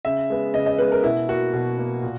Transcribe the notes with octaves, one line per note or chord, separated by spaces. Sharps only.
C#3 E5
G#3 B3
C#3 D#5
D#5
G#3 B3 B4
A#4
B2 E4
A#3 F#4
B2
A#3
A#2